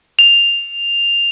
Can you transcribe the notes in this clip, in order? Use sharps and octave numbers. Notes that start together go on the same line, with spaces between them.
F7